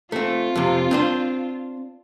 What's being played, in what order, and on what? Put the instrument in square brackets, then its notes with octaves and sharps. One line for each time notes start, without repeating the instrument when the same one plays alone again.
[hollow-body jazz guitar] A3 C4 [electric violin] F4
[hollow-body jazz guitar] F2 C3
C4 D4 C5